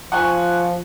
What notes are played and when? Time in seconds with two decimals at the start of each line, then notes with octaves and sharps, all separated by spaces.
0.12 F3 F#5 G#5 C#6